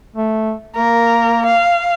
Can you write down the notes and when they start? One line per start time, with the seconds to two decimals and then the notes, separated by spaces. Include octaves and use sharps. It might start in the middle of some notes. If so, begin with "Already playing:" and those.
0.16 A3
0.76 A#3 A#4
1.45 F5